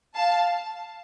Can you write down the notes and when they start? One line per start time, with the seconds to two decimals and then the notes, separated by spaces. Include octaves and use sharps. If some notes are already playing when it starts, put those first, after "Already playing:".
0.16 F5 A5